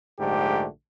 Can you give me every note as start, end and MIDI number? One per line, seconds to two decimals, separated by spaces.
0.20 0.66 34
0.20 0.66 44
0.20 0.66 50
0.20 0.66 57
0.20 0.66 67